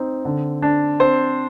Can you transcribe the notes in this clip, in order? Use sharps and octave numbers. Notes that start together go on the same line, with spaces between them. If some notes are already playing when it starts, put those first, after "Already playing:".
Already playing: C4 D#4
D3
D4
C4 C5